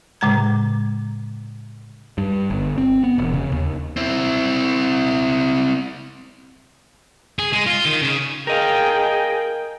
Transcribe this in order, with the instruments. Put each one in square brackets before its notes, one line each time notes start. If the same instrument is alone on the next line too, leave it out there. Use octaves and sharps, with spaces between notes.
[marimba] A2 C#3 G#3 A#5 G#6
[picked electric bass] G2
G1
C4
B3
E1
C#3
D#2
[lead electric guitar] C4 E4
[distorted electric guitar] G#4
G#3
F4
D#3
C#3
[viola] G#4 G5 [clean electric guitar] A#4 D#5 F5